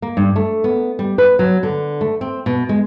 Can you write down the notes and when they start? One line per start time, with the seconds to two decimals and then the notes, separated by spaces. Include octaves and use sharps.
0.02 A#3
0.17 G2
0.36 A3
0.64 B3
0.99 G3
1.18 B4
1.39 F#3
1.63 D3
2.01 A3
2.21 C4
2.46 B2
2.69 G#3